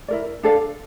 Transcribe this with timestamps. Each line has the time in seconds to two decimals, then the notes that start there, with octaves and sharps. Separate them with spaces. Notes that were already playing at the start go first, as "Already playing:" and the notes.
0.08 E4 A#4 D5
0.43 D4 A4 D5 F5